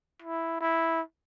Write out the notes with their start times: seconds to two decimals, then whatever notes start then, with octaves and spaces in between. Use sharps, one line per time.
0.22 E4
0.61 E4